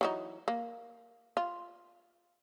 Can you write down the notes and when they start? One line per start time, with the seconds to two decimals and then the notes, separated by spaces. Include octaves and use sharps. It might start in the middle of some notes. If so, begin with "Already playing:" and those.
0.01 E3 F#3 D#4
0.48 A#3
1.37 F4